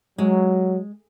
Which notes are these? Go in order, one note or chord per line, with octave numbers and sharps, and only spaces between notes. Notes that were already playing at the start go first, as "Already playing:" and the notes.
F#3 G#3